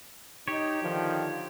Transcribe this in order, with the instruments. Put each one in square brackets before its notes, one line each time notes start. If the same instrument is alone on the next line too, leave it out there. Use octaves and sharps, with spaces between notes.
[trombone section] D#4 [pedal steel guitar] G4 C#5
[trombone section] D3 D#3 F3